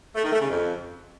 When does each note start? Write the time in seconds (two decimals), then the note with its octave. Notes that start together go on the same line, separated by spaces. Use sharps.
0.15 A3
0.23 D#3
0.32 A3
0.40 C#3
0.49 F2